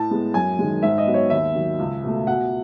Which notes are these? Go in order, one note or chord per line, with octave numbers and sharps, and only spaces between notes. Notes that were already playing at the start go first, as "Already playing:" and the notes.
Already playing: A2 A5
G#3 B3
F#2 G#5
D#3 G#3
G#2 E5
D#5
F#3 B3
C#5
D#2 E5
D#3 F#3
C#2
B2 A3
B2 F#5